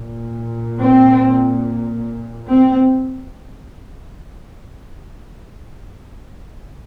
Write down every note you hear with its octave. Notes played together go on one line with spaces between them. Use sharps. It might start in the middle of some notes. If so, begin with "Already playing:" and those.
Already playing: A#2
C4
C4